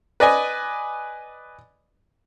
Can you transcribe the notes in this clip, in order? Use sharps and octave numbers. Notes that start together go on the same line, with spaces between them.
B4 D5 D#5 G#5